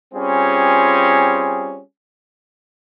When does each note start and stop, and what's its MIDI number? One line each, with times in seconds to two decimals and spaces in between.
0.13 1.80 55
0.13 1.80 60
0.13 1.80 61
0.13 1.80 65
0.13 1.80 68